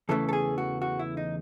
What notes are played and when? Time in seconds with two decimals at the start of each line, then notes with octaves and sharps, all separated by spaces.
0.09 E2 C#3 E3 A3 A4
0.29 A4
0.33 G#4
0.58 F#4
0.82 F#4
0.99 E4
1.17 D#4